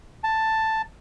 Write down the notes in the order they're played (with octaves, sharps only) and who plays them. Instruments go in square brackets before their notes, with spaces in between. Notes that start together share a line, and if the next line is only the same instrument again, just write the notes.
[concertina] A5